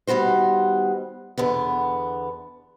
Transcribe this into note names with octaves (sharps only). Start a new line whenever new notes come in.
D#3 G3 B3 F#4 C5
E2 D3 B3